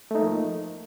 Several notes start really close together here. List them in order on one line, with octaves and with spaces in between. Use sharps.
A3 D#4 A#3 F3